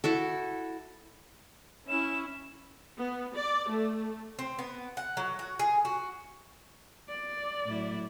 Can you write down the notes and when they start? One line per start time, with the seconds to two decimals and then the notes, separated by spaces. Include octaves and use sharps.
0.04 E4 F#4 A4
1.89 C#4 E4 E7
2.99 B3
3.34 D5
3.70 A3
4.39 C4
4.59 B3
4.97 F#5
5.17 F#3
5.39 F#4
5.59 G#4
5.85 F#4
7.09 D5
7.65 A2 F#3 E4